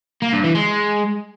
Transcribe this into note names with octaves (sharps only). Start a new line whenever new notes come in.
A#3
G2
E3
G#3